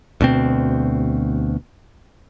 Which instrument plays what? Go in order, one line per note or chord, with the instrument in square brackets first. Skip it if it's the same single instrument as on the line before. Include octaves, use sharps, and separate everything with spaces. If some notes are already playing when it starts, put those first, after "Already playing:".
[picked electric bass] D2 B2 C4